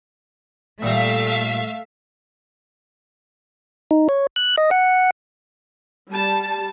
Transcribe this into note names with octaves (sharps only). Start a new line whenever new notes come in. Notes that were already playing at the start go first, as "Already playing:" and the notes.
A#2 G3 A3 E5 F5 A#5
D#4
C#5
F#6
D#5
F#5
G3 A5